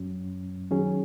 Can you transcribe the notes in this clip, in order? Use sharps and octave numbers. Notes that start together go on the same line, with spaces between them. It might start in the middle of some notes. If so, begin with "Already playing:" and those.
Already playing: F#2 F#3 C#4
D#3 F#3 C#4 G#4